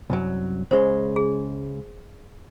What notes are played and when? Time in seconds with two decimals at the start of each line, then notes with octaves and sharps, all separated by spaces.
0.10 C2 F#2 F#3
0.71 C#2 C#3 G#3 C5
1.16 G#4